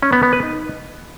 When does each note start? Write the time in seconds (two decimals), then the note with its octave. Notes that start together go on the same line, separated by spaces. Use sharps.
0.02 C#4
0.13 B3
0.23 B3
0.33 B4
0.43 D#4